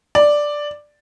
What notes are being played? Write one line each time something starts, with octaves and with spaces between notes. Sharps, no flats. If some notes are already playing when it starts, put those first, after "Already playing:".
D5